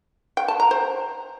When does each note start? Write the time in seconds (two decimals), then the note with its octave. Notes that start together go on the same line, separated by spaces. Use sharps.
0.37 G5
0.48 A5
0.60 A#5
0.71 C5